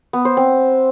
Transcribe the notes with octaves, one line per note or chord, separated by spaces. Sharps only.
B3
C5
C4